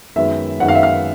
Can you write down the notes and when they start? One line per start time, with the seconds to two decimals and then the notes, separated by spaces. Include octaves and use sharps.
0.16 F#2 D#3 G#3 B3 E5
0.60 F#2 D#3 G#3 B3 F#5
0.69 F5
0.75 E5
0.83 F5